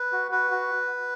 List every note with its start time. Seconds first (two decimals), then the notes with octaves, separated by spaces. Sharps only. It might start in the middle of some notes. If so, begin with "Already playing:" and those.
Already playing: B4
0.12 F#4
0.31 F#4 B4
0.51 F#4